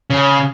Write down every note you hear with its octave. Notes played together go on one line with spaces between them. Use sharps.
C#3